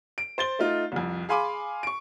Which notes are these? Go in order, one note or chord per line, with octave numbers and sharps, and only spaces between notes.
D7
C5 A6 G7
A3 D#4 F4
C2 F2
G#4 F5 G#5 B5 C6 D6
C#6 D7